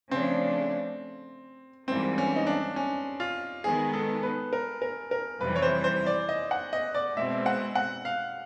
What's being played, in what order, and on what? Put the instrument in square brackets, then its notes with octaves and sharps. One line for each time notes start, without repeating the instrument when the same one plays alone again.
[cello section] C#3 F3 A3 D4 [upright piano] C4
[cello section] G#2 E3 G3 A#3 [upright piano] C4
[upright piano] C#4
D#4
D4
C#4
F4
[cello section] D#3 G#3 B3 [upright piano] G#4
[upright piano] A4
B4
A#4
A#4
A#4
[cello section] F2 C3 E3 G3 [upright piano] B4
[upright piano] C#5
C5
C5
D5
D#5
F#5
D#5
D5
[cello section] B2 G#3 C4 [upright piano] E5
[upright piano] F#5
F#5
F5